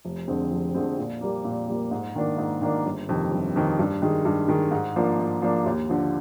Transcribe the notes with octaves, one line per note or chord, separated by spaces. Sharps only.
F1
F2 D3 G#3 C4
F1
F2 D3 G#3 C4
A#2
G3 A#3
A#2
G3 A#3
G#2
D#3 A#3 D4
G#2
D#3 A#3 D4
G1
F2 C3 D#3
G1
F2 C3 D#3
G2
D#3 G#3
G2
D#3 G#3
G#2
F3 A#3 D4
G#2
F3 A#3 D4
D#2
D3 F3